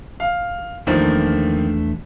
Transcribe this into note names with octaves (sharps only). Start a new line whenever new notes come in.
F5
E2 D#3 F3 A3 A#3 D4